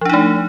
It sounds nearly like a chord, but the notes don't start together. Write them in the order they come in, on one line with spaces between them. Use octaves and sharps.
F3 D4 D#4 A3